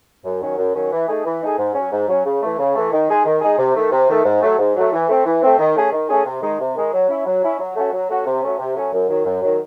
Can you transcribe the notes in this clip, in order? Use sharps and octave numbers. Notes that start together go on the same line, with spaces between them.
F#2
D#3 F#3 C#4
F#2
D#3 F#3 C#4
E3
A3 D#4 G#4
E3
A3 D#4 G#4
G#2
F#3 C#4
G#2
F#3 C#4
C#3
E3 A3
C#3
E3 A3
D#3
G#3 D#4 G#4
D#3
G#3 D#4 G#4
C3
D#3 A3
C3
D#3 A3
G#2
F#3 A3
G#2
F#3 A3
E3
A3 C4
E3
A3 C4
D#3
A3 C#4 G#4
D#3
A3 C#4 G#4
C3
D#3 G#3 D#4
C3
D#3 G#3 D#4
F#3
C#4 E4
F#3
C#4 E4
F#3
A3 C#4 F#4
F#3
A3 C#4 F#4
C3
F#3 A3 C#4
C3
F#3 A3 C#4
F#2
D#3 F#3
F#2
D#3 F#3